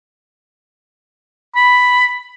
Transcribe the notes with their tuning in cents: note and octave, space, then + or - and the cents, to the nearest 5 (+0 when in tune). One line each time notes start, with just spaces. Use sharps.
B5 +0